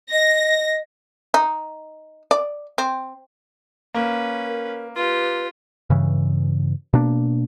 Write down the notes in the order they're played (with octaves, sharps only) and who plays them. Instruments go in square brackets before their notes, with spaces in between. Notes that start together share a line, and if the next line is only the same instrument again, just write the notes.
[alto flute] D#5 [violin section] A#6
[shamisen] D#4
D5
C4
[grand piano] A#3 [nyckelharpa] C#4 B4
[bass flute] A#4
[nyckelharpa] F4 G4 [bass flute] B4
[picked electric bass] G2 C#3 E3
B2 A#3 D4